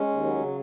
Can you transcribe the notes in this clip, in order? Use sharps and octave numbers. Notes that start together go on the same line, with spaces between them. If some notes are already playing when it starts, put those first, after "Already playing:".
Already playing: G#3 C#4
D#2
F#3
C#3